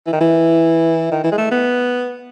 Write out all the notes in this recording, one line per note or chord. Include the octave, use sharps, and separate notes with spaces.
E3
D#3
E3
D#3
E3
G#3
A3
B3